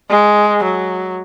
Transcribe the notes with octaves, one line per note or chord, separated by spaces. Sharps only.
G#3
F#3